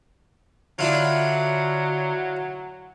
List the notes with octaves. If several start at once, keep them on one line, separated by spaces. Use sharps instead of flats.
D3 F#3 D4 E4 F4